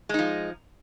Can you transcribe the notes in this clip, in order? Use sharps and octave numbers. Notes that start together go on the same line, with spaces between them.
F3 G#3 D#4